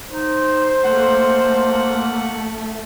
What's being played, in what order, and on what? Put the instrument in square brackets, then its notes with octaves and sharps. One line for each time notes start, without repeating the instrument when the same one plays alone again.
[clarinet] D#4 [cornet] C5
[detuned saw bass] A3 [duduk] A#3 [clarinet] F#5